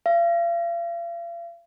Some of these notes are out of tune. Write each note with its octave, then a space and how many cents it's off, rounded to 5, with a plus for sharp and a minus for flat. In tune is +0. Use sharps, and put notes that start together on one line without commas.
F5 -40